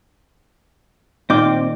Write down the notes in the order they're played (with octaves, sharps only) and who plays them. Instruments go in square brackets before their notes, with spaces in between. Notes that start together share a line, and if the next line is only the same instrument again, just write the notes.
[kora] A#2 D#3 G5 [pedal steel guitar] C4 D6